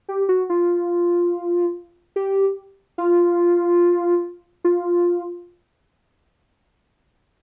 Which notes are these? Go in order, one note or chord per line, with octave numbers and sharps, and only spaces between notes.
G4
F#4
F4
G4
F4
F4